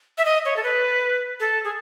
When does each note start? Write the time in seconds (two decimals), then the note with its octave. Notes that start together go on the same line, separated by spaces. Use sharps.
0.18 E5
0.25 D#5
0.45 C#5
0.56 A4
0.63 B4
1.40 A4
1.64 G#4